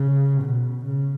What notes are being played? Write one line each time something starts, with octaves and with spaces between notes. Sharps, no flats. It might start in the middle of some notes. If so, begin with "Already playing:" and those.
Already playing: C#3
B2
C#3